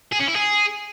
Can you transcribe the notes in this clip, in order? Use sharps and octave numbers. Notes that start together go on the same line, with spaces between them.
G#4
C#4
E4
G#4